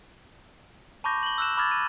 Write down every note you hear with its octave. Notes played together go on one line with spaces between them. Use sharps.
A5 B5 C#6 D6 G6 A#6
F#7 G7
E6 F#6 E7
B5 D6 F6 G#6 A6
D#7